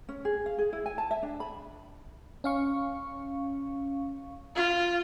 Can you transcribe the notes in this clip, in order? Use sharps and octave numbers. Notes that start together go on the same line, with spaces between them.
C#4
G#4
F5
G#4
E4
G#5
A5
E5
D4
B5
C#4 F5 C#6
F4